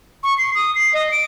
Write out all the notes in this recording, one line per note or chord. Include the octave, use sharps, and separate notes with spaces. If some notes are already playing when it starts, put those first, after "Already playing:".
C#6
C7
D#6
C7
D#5
D7